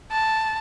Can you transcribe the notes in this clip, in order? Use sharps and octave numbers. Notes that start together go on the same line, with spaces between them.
A5